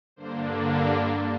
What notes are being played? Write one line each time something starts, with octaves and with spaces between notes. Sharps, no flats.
G2 D3 A#3 D4 C5
G4